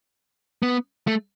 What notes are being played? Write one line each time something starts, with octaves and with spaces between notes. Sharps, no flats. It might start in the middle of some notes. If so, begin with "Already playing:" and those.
B3
A3